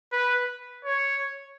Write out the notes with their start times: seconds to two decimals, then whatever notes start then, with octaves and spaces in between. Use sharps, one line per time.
0.12 B4
0.85 C#5